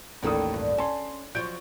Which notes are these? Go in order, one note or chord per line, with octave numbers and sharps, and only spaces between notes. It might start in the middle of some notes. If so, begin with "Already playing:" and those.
A1 D#2 A2 D#3 A4 D#6
G2
C#4 A5 C6
F3 F#3 G6 D7